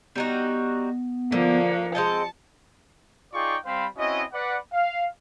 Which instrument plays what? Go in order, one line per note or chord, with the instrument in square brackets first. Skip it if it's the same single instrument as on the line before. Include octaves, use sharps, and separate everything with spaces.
[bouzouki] G3 D#4 F#4 [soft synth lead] B3
[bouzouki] D3 [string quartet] F3 A#3
[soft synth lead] C#7
[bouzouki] G#3 C4 D#5 [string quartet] A5
[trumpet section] D#4 F4 G#4 D5 G5 C#6
G3 C4 C5 F5 B5
C4 C#4 E4 F#4 D#5
B4 D5 F#5
F5